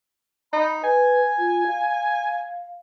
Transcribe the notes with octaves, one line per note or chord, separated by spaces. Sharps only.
D#4 B5
B4 G#5
F4
F5